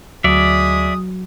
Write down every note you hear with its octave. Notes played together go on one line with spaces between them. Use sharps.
D2 F#3 G#3 D5 E5 D#6